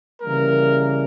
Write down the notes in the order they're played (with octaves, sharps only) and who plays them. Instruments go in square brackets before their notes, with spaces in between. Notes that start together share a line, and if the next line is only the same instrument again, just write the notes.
[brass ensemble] C#3 E3 G3 A#3 A#4